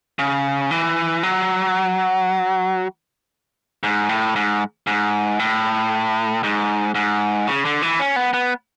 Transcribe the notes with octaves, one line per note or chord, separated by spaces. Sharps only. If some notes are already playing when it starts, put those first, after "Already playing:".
C#3
E3
F#3
G#2
A2
G#2
G#2
A2
G#2
G#2
C#3
D3
E3
C#4
B3
B3